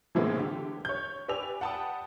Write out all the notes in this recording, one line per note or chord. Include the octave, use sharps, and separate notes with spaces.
A2 C3 E3 G#3 A#3 B3
D3 G4
C#5 G6
G4 B4 D5 G#5 E6 F7
F#5 G5 A5 B5 D#6